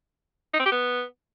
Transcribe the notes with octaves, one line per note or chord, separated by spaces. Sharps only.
D#4
C4
G4
B3